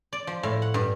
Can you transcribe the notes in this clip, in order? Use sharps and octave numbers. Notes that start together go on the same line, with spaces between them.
D5
F3
A2
F#5
G2